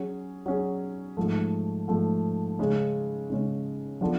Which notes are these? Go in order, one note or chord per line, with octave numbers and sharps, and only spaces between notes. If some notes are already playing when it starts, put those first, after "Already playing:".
Already playing: F#3 C#4 G#4
F#3 C#4 G#4
G#2 F3 A3
G#2 F3 A3
C#3 G#3 C#4
C#3 G#3 C#4
F3 B3 D4 F4 A4